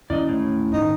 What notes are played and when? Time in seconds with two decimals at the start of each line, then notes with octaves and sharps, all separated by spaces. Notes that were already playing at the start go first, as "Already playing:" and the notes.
0.10 D#2 D3 G#3 C#4 E4 D5 D#5
0.29 A2
0.73 D#1 G#2 D#3 D#4